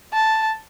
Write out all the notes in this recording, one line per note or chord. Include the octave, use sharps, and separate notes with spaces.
A5